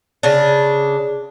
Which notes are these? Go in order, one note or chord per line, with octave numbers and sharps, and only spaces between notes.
C#3 D4